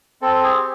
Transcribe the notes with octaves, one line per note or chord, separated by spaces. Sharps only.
C4 A4
G#4
G4